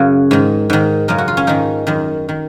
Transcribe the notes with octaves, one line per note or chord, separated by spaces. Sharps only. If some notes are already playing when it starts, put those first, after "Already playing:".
Already playing: F#2 C#3 F#4
G#2 D#3
G#2 D#3
F#2 C#3 A#4
F#4
F4
C#4
G#2 D#3 D#4
F#2 D#3
D#3